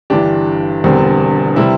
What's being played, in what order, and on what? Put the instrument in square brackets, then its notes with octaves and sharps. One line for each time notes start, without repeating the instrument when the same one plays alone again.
[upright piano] G1 G2 E3 D4 G4
E1 E2 D3 G3 C4
C3 G3 C4 E4